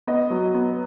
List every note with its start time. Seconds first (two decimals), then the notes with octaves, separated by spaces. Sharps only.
0.07 B3 D#5
0.30 F#3
0.55 B3